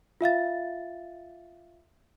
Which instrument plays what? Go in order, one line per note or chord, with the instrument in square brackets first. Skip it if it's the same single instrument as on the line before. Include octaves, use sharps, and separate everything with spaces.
[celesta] F4 E5 F5 A6